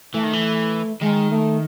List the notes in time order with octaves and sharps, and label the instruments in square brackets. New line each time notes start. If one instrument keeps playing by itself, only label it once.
[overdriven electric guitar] E3 [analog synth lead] A3
[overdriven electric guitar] D#3
E3
[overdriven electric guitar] D#3 [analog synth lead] G#3
[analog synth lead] A3